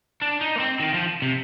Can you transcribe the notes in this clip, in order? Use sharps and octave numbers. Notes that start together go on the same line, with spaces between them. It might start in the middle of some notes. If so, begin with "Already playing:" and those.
D4
D#4
A#3
C4
D#3
F3
C3